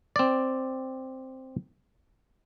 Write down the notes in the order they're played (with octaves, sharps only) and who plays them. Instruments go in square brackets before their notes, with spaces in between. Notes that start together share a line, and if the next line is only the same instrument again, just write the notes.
[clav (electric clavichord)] C4 D5